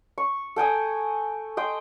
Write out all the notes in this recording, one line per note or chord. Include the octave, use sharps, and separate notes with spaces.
C#6
A4 G5 G#5 D#6
D#5 G5 C6